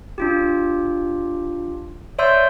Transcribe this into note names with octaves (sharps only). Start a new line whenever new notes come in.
D4 F4 G4
C#5 D5 E5 C6 E6 G6